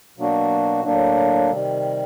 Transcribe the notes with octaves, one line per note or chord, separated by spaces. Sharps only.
B2 F#3 A#3 D4 F#4
A2 F#3 A#3 D4
C3 D#3 G3